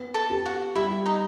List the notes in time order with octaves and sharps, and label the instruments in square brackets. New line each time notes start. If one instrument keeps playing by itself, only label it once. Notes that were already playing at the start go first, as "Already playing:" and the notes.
Already playing: [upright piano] B3
[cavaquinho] A4 A5
[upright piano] G4
[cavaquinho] F#4 F#5
[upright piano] G3 [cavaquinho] E4 E5
[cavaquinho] D#4 D#5